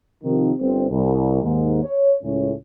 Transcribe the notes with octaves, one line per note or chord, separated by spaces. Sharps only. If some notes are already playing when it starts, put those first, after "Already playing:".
C3 D#3 F3
G1 C4
C2
D#2 G#2
C#5
C#2 A2 C#4